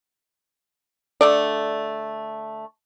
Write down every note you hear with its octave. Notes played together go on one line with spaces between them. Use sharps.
D3 A3 D5